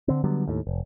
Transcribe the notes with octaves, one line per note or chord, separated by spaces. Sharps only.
D3 C4
D3 F#3 G3 B3
D#2 A2
F1